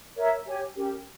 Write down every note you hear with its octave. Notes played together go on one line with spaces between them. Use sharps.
A#4 C#5 E5
G4 C#5 G#5
C#4 G4 A#4